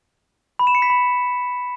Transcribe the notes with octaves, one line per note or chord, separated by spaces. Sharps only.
B5
E7
C#7
B6
B5